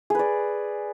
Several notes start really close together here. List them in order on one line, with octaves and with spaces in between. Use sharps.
G#4 B4 D5